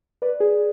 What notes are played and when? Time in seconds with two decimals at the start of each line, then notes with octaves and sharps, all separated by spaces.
0.22 B4 D5
0.40 G#4